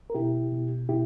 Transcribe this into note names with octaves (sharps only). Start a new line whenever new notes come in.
A#4
B2 E4 G4
B2
B2 E4 G4